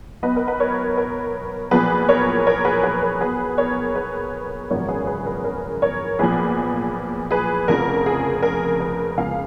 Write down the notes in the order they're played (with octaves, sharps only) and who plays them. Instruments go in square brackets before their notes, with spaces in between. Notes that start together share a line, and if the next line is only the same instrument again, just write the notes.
[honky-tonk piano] B1 B2 B4 D#5
A#4
B4
A#4 C#5
A#4
B1 A#2 F3 G#4 B4
A#4 C#5
A#4 C#5
G#4 B4
G#4 B4
A#4
B1 B2 G#4 B4
A#4 C#5
G#4 B4
G#1 F#2 C#3 F3 A#4 C#5
G#4 B4
G#4 B4
A#4
A#4
A#4 C#5
B1 A#2 F3 G#4 B4
G#4 B4
F1 F2 C#3 F3 A#4
G#4
A#4
G#4 B4
C#2 C#3 F3 F5 G#5